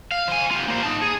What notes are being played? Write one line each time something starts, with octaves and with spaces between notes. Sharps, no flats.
F5
C5 G#5
F4 G4
A#3 C5
D#4 A5
G#4